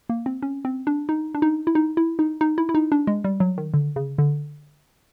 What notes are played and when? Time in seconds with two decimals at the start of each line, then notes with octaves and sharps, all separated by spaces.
0.10 A#3
0.26 C4
0.42 C#4
0.65 C4
0.87 D4
1.09 D#4
1.34 D4
1.42 D#4
1.67 E4
1.75 D#4
1.97 E4
2.19 D#4
2.41 D#4
2.58 E4
2.69 E4
2.75 D#4
2.92 D4
3.07 G#3
3.24 G3
3.40 F#3
3.58 D#3
3.74 D3
3.96 C#3
4.18 D3